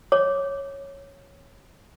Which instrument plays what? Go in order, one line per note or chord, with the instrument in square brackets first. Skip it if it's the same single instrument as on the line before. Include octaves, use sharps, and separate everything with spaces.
[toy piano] C#5 D6